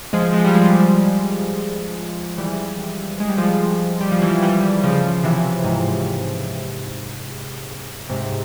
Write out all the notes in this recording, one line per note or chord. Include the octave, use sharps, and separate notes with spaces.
F3 G#3
F3 G#3
G3
F3 G#3
E3 G3
G#3
G3
F3 G#3
G3
F3
E3 G3
E3 G3
C#3 F3
C3 E3
G#2 C3
G#2 C3